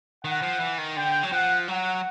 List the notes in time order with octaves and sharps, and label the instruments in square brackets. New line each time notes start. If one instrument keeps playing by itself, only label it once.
[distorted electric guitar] D#3 [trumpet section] F#5
[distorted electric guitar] F3
E3
D#3
[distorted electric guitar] D3 [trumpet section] G5
[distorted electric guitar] F#3
[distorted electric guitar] F3 [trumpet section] F#5
[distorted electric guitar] F#3 [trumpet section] F#5